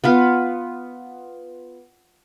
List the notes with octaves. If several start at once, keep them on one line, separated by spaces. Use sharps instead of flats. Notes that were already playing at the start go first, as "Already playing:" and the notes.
B3 F4 B4